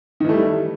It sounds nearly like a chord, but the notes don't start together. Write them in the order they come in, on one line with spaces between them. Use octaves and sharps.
D#3 E3 A3 G3